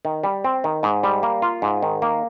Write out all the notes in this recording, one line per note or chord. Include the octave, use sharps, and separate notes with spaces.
D#3
G3
C4
D#3
G#2
G3
A#3
F4
G#2
D#3
A#3